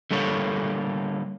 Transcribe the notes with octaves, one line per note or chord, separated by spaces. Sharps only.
D3 G3 A#3 A4 C#5